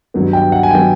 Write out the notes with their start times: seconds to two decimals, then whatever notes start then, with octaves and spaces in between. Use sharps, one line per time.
0.14 G2 D#3 F#3 B3
0.33 G5
0.52 F#5
0.63 G#5
0.71 D#3 F#3 B3 G5